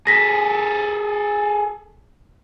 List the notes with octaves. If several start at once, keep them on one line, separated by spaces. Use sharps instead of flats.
G#4 A4 A#6 B6